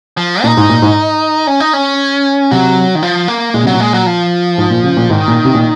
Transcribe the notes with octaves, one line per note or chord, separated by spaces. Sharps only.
F3
A#2 D#4
G#2
A#2
G#2
C#4
D#4
C#4
C3 F#3
D#3
F3
A#3
A#2 G#3
C3 F#3
A#2
G#3
F#3
F3
G#2
A#2
C#3
A#2
G#2 D#3
A#2
C3
A#2